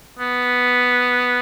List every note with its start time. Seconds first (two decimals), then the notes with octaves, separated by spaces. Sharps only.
0.19 B3